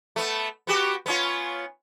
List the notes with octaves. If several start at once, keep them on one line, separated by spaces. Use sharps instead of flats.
A3 B3
B3 F#4 G4
B3 C#4 F4